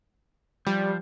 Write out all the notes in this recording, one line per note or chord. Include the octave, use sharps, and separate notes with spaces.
F3 G3